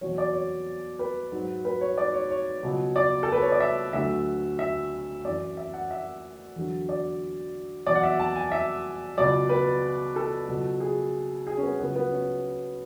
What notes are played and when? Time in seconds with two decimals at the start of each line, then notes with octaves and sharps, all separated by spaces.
0.01 E2 B2 F#3 C#5
0.18 D5
0.33 C#5
0.99 B4
1.32 G#2 F#3
1.65 B4
1.81 C#5
1.98 D5
2.14 C#5
2.30 C#5
2.63 C#2 B2 F#3
2.96 D5
3.23 A4
3.32 B4
3.42 C#5
3.52 D5
3.60 E5
3.93 D2 D3 F#3 E5
4.59 E5
5.25 F#2 E3 D5
5.57 E5
5.73 F#5
5.91 E5
6.56 E2 D3 F#3
6.89 D5
7.86 E2 B2 F#3 D5
7.95 F#5
8.03 E5
8.20 A5
8.36 G#5
8.52 E5
9.17 C#2 B2 F#3 D5
9.49 B4
10.16 A4
10.48 C#2 B2 F#3
10.80 G#4
11.47 G#4
11.57 C#4
11.63 B3
11.80 C#2 C#3 F#3 B3
11.96 B3
12.12 C#4